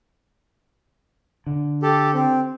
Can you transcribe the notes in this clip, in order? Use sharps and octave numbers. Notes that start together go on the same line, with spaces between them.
D3
G4 A4
C4